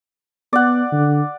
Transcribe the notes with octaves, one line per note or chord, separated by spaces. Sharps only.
B3 D5 F#5
D3